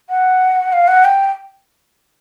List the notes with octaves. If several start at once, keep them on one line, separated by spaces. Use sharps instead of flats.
F#5
F5
F#5
G5